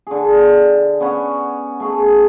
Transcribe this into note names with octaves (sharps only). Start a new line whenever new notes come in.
D3 G#4
B3 C#4 C#5 F#5
A3 G#4